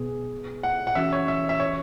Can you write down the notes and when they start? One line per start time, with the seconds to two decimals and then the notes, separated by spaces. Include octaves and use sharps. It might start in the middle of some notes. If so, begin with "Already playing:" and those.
Already playing: B2 B3 G#4
0.63 F#5
0.87 F#5
0.95 E3 C#4 F#4 E5
1.12 C#5
1.28 E5
1.49 E5
1.60 C#5